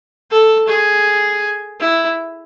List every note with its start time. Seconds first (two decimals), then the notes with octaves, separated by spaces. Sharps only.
0.31 A4
0.68 G#4
1.80 E4